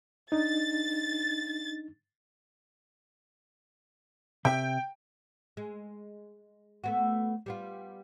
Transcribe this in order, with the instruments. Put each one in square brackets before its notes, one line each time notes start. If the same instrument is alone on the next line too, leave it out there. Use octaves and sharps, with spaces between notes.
[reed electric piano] D4 D#4 [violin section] A6
[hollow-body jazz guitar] C3 E5 [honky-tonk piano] G5
[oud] G#3
A3 B3 F#4
G3 B3 F4